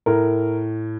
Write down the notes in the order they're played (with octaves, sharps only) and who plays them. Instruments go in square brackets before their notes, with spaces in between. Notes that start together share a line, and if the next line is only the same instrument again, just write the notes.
[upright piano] A2 A#4